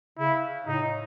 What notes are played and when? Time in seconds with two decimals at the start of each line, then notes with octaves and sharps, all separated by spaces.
0.18 C#3 E4
0.67 A2 D#4